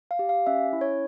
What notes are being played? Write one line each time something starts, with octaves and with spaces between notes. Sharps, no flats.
F5
G4
F5
C#4 E5
E4
C#5